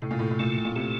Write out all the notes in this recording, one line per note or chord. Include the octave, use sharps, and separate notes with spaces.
A2 C3
A#2
A2
A2
A#2 A3
A#2
C3 A3